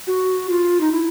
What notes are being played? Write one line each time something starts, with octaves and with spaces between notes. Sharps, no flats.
F#4
F4
D#4
E4